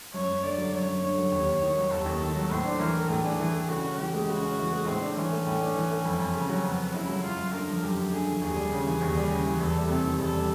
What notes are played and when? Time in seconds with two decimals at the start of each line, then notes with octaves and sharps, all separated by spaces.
0.13 F#2 C#5
0.28 F#2
0.43 D3 D5
0.58 F#3
0.72 F#2 C#5
0.87 F#2
1.02 D3 C#5
1.18 F#3
1.32 D#2
1.47 D#2
1.62 D#3
1.77 F#3
1.91 D#2 A4
2.06 D#2
2.21 D#3
2.35 F#3
2.50 A2 C5
2.65 D4
2.79 E3 A#4
2.95 A3
3.09 A2 G#4
3.24 D4
3.39 E3
3.53 A3
3.69 C#3 F#4
3.84 C#4
3.98 E3 G4
4.14 G#3
4.28 C#3 F#4
4.42 C#4
4.58 E3
4.72 G#3
4.86 A2 C4
5.01 D4
5.16 E3 C#4
5.31 A3
5.46 A2
5.61 D4
5.75 E3
5.91 A3
6.05 F2
6.19 F2
6.35 C#3
6.49 F#3
6.64 F2 B3
6.79 F2
6.94 C#3 E4
7.09 F#3
7.23 F#2 F4
7.38 F#2
7.53 D3 A#4
7.68 F3
7.82 F#2 G4
7.97 F#2
8.12 D3 G#4
8.27 F3
8.42 D#2 G#4
8.57 G3
8.72 C#3
8.86 E3
9.01 D#2
9.15 G3
9.30 C#3
9.45 E3
9.60 E2 A4
9.75 G3
9.89 C3 A4
10.04 D#3
10.18 E2 A4
10.34 G3